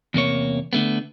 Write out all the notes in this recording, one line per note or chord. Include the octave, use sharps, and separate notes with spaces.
E2 C3 A#3 C#5
D3 A3 B3